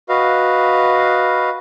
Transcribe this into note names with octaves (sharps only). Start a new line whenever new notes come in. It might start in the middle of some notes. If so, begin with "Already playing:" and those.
F#4 B4 D#5 F5